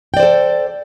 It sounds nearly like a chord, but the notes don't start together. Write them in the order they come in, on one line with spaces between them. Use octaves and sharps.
G5 D5 C5 A4